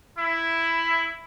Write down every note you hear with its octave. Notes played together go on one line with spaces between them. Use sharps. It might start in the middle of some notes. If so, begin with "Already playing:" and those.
E4